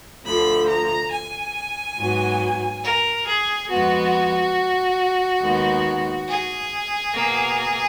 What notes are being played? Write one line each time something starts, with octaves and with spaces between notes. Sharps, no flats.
D2 D3 F3 B5
A#5
G#5
G#2 F#3 B3
A#4
G#4
F2 F3 G#3 B3 F#4
D#2 D#3 G#3 B3
G#4
B2 A#3